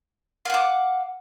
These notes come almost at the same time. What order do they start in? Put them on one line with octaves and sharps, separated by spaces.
F5 F#5 D6